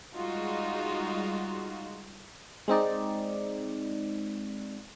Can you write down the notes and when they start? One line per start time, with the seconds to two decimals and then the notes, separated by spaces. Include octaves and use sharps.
0.15 G3 G#3 D#4 F4 F#4
2.68 G#3 C4 D#4 D5